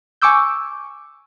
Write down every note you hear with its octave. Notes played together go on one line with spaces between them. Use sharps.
G#5 C#6 D6 E6 G6